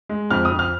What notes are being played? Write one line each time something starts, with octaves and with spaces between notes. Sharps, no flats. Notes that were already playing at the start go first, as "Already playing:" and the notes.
G#3
F2 F6
D#6
F2
F6